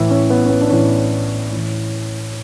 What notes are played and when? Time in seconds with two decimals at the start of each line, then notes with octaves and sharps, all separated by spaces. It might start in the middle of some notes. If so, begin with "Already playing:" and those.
Already playing: A2 E3 E4
0.10 C#4
0.30 B3
0.45 C#4
0.50 B3
0.61 D4
0.70 A2 E3 C#4
1.51 A2 E3